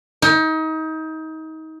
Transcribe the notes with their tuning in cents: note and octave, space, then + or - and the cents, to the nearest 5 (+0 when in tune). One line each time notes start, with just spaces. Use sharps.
D#4 +30